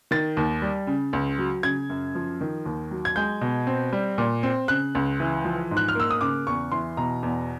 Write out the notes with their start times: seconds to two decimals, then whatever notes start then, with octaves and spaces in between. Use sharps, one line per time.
0.11 D#3 A6
0.37 D#2
0.62 G3
0.87 C#3
1.13 C#2
1.38 F#3
1.63 C#3 G#6
1.90 F#2
2.15 F3
2.41 D#3
2.66 D#2
2.91 F#3
3.05 G#6
3.16 G#3 G6
3.41 B2
3.67 C4
3.93 G3
4.18 A#2
4.43 C4
4.68 C#3 F#6
4.95 C#2
5.20 E3
5.45 F3
5.71 G#2
5.77 F#6
5.88 F6
5.95 A#3 E6
6.10 D#6
6.21 C#3 D6
6.47 E2 C#6
6.72 E3 C6
6.97 B2 A#5
7.23 E2